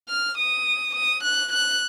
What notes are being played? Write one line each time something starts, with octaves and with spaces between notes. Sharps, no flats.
F6
D#6
D#6
F#6
F#6